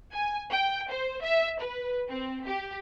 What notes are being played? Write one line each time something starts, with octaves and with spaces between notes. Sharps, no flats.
G#5
G5
C5
E5
B4
C4
G4